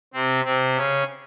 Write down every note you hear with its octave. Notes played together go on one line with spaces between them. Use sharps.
C3 C4
C3 C4
C#3 C#4